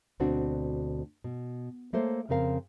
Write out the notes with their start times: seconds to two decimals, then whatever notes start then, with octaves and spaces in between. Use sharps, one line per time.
0.20 D2 B2 C4 D4 F#4
1.24 B2
1.93 A3 A#3 A4 C5 C#5
2.29 F2 C#3 C4 A#4 F5